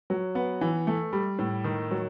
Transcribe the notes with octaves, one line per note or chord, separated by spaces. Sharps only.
F#3
B3
E3
A3
G3
A2
D#3
F#3